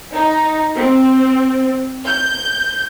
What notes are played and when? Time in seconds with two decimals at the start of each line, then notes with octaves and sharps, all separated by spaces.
0.13 D#4
0.76 C4
2.05 G6